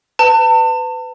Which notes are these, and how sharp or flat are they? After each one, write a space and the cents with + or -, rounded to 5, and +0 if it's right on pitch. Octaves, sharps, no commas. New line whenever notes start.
B4 +25 A5 +35